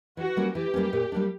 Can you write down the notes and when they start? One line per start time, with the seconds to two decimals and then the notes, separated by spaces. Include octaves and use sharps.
0.17 E3 F#4
0.37 G3 A#3 C#4
0.55 E3 G4
0.74 G3 A#3 C#4
0.93 A#2
1.12 G3 A#3 D4